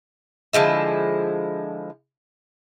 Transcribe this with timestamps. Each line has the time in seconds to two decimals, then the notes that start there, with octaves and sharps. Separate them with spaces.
0.53 D3 F3 G#3 E4